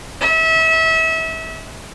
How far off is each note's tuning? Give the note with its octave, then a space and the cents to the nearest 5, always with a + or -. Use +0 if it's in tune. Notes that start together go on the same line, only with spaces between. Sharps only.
E5 -30